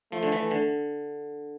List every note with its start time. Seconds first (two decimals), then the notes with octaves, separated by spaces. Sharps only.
0.12 F3 A3
0.23 D3
0.32 E3
0.51 D3